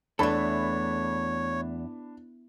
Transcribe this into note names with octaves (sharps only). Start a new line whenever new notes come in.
E2 A3 D4 A4 C#5 B5